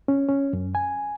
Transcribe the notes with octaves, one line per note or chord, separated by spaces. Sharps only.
C#4
C#4
F#2
G#5